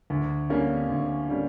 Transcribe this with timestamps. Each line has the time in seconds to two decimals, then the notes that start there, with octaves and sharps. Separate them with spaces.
0.10 D2
0.49 D3 G3 A#3 C#4
0.89 D2
1.28 D3 G3 A#3 C#4